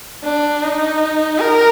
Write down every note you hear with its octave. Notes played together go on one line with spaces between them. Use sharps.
D4
D#4
A#4